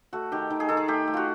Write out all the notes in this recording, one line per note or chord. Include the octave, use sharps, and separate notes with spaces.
A3 F#4
D#3 G4
D#3
G#4
D#3 A4
G#4
A3 G4
A3
F4 F#4